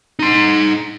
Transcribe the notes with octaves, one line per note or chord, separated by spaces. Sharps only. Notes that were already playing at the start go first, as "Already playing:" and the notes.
D#4 C6